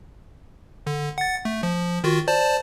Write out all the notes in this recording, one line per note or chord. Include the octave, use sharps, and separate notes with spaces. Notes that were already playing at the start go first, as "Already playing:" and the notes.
D3
F#5 A6
A3
F3
D#3 F4 F#4
C5 D5 A5